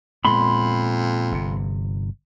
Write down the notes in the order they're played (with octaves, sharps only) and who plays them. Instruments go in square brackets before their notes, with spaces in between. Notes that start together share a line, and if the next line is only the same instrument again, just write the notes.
[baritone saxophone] F2 [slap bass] A#2 G#3 B3 [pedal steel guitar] B5 C6
[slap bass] G1 C3